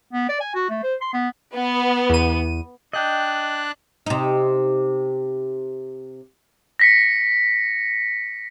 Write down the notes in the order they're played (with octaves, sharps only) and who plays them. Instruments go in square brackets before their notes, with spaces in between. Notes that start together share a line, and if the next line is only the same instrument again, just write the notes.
[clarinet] B3
D5
G#5
F#4
A3
C5
C6
B3
[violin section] B3
[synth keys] E2 D#7
[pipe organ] D4 F#6 [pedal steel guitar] D#5 G5
[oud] C3 D#4
[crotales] A#6 B6 C#7